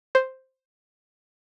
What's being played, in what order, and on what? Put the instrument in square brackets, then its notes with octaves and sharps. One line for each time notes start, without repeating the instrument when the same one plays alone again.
[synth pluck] C5